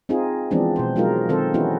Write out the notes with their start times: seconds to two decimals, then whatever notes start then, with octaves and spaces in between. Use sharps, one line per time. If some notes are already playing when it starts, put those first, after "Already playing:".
0.09 C4 D#4 F4 G#4
0.51 E3 F3 G#3 B3 C4 D4
0.76 B2 C5
0.96 F#3 G#3 D#4 F4 A#4
1.29 D#3 C4 A4 C5
1.54 E3 B3 C#4 D#4 E4 F#4